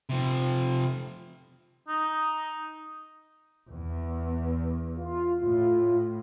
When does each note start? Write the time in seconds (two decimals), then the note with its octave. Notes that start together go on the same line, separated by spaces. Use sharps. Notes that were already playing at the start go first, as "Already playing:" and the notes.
0.09 C3 F3
1.88 D#4
3.70 E2
4.96 F4
5.41 A2 F4